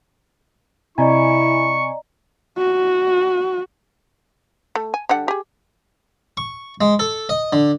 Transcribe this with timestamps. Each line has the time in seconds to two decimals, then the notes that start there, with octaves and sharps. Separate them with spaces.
0.98 C3 E4 D5 D#5 G#5 A#5 C#6
2.58 F#4
4.75 A3
4.94 G#5
5.09 D3 G3 F#5
5.28 G4 G#4
6.37 C#6
6.81 G#3
6.99 A4
7.29 D#5
7.53 D3